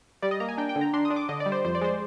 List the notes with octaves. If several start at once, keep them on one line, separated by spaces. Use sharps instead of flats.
G3 D5
D#5
A#3 A#5
G#5
D4 G5
G5
D3
A#5
D4 C6
D#6
D4
D6
D3 D#5
D5
G3
C5
F2 C5
D5
G#3 C5